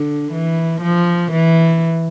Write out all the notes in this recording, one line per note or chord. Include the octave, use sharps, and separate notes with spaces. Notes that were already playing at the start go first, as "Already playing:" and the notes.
Already playing: D3
E3
F3
E3